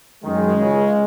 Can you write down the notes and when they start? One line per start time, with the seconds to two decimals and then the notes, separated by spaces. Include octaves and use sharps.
0.24 F#2 D#3 G#3
0.60 C#2 C#3